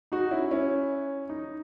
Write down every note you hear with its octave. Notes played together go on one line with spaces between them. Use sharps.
D#4 F#4
C#4 E4
C#4 E4
D#4